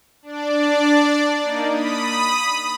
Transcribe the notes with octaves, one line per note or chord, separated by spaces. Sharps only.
D4 D5
A#3 D#4
B5 D#6